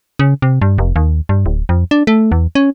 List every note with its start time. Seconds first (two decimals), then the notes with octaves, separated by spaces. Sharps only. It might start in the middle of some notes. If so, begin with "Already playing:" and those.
0.19 C#3
0.42 C3
0.62 G2
0.78 F1
0.96 D#2
1.29 G2
1.46 D1
1.69 F2
1.91 D4
2.07 A3
2.32 E2
2.55 C#4